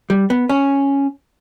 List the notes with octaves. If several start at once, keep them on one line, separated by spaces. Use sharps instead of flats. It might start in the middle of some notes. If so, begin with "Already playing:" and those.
G3
B3
C#4